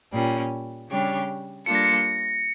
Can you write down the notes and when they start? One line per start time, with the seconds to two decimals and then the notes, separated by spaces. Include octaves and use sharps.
0.12 A#2 G3 C#4
0.88 C#3 G3 D4 G4 C#5
1.66 G3 A#3 D4 F4 A4 C#7
1.75 A#6
1.85 C#7